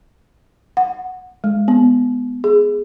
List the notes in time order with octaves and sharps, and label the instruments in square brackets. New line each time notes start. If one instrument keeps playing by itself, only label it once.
[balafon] F#5
G#3
B3
G#4